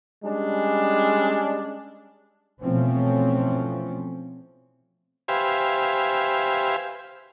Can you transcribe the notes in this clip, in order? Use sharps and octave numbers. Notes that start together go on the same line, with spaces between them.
G3 G#3 C#4 D4
B2 E3 F3 A3 C4 C#4
G4 B4 C5 E5 F5 G#5